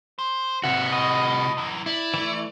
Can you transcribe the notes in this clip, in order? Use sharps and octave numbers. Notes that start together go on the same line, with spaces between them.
C5
C3 F#4 E5 F#5
A2 D#5
F#2 E3
E4 D5
E3 A3